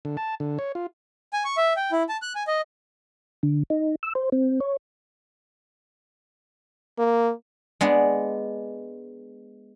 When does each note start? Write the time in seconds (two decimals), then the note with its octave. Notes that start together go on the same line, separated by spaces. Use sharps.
0.05 D3
0.17 A5
0.40 D3
0.59 C#5
0.75 F4
1.33 G#5
1.45 C#6
1.57 E5
1.76 G5
1.92 E4
2.09 A5
2.22 F#6
2.35 G#5
2.47 D#5
3.43 D3
3.70 D#4
4.03 E6
4.15 C5
4.32 C4
4.60 C#5
6.99 A#3
7.81 G#3 B3 D4